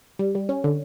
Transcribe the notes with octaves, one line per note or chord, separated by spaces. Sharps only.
G3
G3
C#4
D3